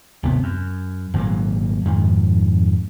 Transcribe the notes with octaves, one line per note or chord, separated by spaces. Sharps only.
G#1 D#2 C3 B3
F#2
G#1 A#2 F#3 A#3
F2 G#2 D#3